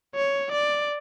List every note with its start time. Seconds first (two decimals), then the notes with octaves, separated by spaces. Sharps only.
0.15 C#5
0.52 D5